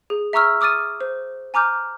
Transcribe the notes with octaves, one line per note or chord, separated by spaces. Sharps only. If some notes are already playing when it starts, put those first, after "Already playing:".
G#4
E5 A#5 C#6 E6 F6
D6 D#6 F6 A6 D#7
C5
G#5 A#5 D6 F6 G6